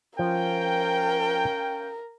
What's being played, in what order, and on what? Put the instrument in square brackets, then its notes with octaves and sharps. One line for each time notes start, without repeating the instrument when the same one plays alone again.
[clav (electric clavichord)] F3 [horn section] C#4 F5 G5 [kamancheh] A#4